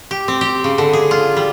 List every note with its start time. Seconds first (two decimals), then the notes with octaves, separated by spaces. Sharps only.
0.11 G4
0.28 C4
0.41 G4
0.64 C#3
0.78 D3
0.93 G#4
1.11 F4
1.37 G3